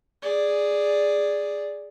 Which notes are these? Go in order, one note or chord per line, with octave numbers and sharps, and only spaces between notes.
G#4 D5